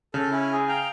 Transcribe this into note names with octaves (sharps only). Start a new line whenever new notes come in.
C#3 A4
C#4 E4
G#4
F5 G5 A#5